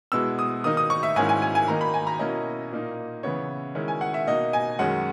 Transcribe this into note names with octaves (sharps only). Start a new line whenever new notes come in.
B2 G#3 B3 E4 E6
D#6
D#3 A#3 D#4 D#6
D#6
C#6
E5
G#2 D#3 A#3 C#4 E4 G#5
G#5
G#5
G#5
D#3 A#3 D#4 A#5
B5
G#5
A#5
B2 A#3 C#4 E4 D#5
A#2 A#3 D#4
C#3 E3 B3 E4 C#5
D#3 G#3 C#4 E4
G#5
F#5
E5
B2 A#3 D#4 D#5
G#5
F#2 D#3 G#3 C#4 F#5